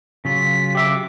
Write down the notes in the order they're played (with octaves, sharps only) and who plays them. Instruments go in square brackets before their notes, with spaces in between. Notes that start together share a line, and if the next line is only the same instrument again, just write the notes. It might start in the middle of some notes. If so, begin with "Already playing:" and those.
[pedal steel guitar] C#3 F#3 F4 [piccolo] B6
[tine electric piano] G4 E5 D6